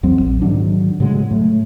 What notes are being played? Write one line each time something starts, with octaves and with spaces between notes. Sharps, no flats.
E2 F#3 C4
A#1
G#2 D#3 F#3 D4
A2 C#3 F#3 G#3
A2 A3